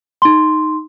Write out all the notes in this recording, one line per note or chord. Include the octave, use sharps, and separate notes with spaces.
D#4 C6